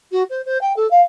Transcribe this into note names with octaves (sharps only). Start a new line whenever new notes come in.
F#4
C5
C5
G5
A4
F5